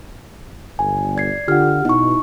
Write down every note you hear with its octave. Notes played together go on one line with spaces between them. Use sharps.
G1 G#5
D5 G#6 C7
D3 F4 G4 F#5 F6
B2 D#4 E4 C#6